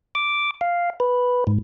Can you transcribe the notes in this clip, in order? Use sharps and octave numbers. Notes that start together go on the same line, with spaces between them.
D6
F5
B4
G#2